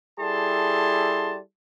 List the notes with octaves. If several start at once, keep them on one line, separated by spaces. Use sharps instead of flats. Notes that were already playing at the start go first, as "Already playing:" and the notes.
G3 E4 G#4 A4 A5 C6